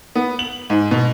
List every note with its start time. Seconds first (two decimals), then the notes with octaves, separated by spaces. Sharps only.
0.15 B3
0.39 F#7
0.70 G#2
0.91 B2